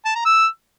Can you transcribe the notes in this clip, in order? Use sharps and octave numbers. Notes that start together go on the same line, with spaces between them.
A5
A#5
E6